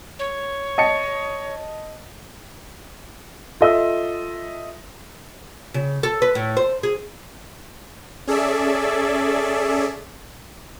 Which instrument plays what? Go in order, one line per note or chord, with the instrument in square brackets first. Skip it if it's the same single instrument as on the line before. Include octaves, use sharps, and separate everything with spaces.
[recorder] C#5
[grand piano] D#5 A5 C#7
F4 A4 D#5 E5 C6 E6
[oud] C#3
A4
B4
A2
C5
G#4
[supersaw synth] C#4 G#4 A4 D5 E5